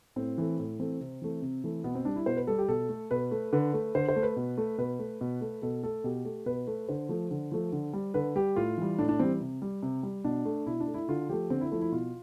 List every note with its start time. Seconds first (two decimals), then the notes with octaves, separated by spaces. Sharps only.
0.16 A2 C4
0.38 E3 A3
0.59 A2
0.79 E3 A3 C4
1.00 C3
1.22 E3 A3
1.42 C3
1.64 E3 A3
1.84 B2 B3
1.95 C4
2.05 G3 D4
2.16 E4
2.26 B2 C5
2.37 B4
2.47 G3 A4
2.58 G4
2.68 B2 A4
2.89 A3
3.11 B2 B4
3.31 A3
3.53 D3 B4
3.74 A3
3.95 D3 C5
4.08 C5
4.16 A3
4.23 B4
4.36 B2
4.58 A3
4.78 B2 B4
4.99 A3
5.21 B2
5.41 A3
5.62 B2 A4
5.83 A3 A4
6.04 B2 G4
6.25 A3
6.46 B2 B4
6.67 A3
6.89 D3 C5
7.09 F3 A3
7.31 D3
7.52 F3 A3
7.72 D3
7.93 G3
8.14 D3 B4
8.36 G3 G4
8.56 A2 F4
8.78 E3 G3
8.99 A2 D4
9.09 D4
9.19 E3 G3 C4
9.40 C3
9.62 G3
9.83 C3
10.03 G3
10.24 B2 D4
10.45 A3
10.66 B2 E4
10.80 D4
10.87 A3
10.94 E4
11.09 D3 F4
11.29 F3 A3 G4
11.50 D3 C4
11.61 E4
11.71 F3 A3 E4
11.82 E4
11.92 B2 F4